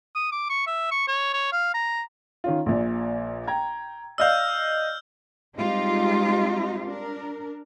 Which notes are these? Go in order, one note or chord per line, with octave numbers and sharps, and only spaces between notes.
D#6
D6
C#6
E5
C#6
C#5
C#5
F5
A#5
D#3 C#4 F4
A#1 A#2
G5 A#5 G#6
D5 D#5 F5 E6 F6 G6
G3 G#3 C4 D#4 F4 G4
D4 A#4